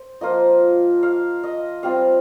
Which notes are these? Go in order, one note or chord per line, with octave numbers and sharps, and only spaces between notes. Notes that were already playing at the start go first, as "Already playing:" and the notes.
Already playing: C5
F3 A#3 F4 D#5
F5
D#5
G3 C4 F4 F5